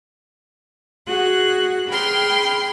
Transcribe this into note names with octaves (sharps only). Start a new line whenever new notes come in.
F#4 G#4 F#6
G#4 G5 B5 C6 F6